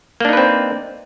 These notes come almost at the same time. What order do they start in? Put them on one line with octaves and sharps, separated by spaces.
A#3 D4 D#4 B4 C4